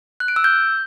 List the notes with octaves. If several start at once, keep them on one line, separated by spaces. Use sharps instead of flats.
F#6
D7
E6
G6